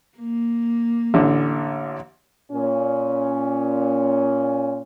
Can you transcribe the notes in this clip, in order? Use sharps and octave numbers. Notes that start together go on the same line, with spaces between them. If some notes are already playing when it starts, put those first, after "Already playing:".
A#3
A1 D3
A#2 C#4